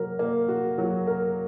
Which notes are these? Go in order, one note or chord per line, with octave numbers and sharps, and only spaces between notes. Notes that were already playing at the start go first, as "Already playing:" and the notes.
Already playing: F#3 A#3 A#4
A#3
F#4
F#3
A#4